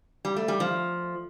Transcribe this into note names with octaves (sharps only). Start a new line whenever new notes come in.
G3
A3
G3
F3